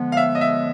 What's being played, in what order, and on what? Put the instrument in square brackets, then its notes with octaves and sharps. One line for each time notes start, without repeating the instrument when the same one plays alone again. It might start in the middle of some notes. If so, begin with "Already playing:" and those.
Already playing: [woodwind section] D3 F3 G#3 B3
[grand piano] F5
E5
D#5
E5